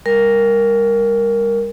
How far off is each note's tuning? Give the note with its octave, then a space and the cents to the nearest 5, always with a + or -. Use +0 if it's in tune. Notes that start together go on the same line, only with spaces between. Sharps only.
G3 +40 A#4 +0